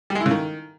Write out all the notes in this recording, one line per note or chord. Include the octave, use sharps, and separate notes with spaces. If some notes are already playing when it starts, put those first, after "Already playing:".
G3
G#3
E4
C#3
D#3